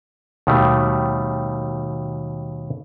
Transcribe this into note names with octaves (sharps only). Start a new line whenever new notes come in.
D#2 B2 D#3 G3 A3